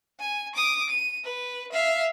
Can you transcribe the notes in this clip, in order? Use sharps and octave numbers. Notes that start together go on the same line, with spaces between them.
G#5
D6 D#6
D#7
B4
E5 F5